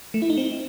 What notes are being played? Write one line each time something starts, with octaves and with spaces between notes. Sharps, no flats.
A3
E4
D#4
C4